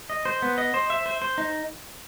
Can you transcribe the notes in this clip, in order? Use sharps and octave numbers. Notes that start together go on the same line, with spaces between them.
D#5
C5
B3
D#5
C5
E5
C5
C5
D#4